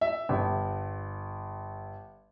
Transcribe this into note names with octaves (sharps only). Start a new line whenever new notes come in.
E5
G1